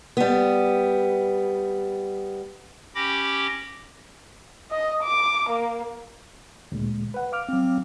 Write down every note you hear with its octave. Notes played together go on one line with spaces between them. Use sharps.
G3 B3
C#4 G4 G5 B5 D6 A#6
D#5
D6
A#3
D2 A#2 G#3
B4 F#5
F5 D6 F6
F#3 C4